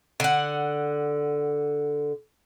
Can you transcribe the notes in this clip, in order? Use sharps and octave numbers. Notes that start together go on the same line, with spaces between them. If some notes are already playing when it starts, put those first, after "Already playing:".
D3 F#5